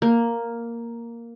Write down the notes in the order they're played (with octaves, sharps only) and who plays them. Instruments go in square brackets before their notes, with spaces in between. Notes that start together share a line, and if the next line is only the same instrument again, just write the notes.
[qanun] A#3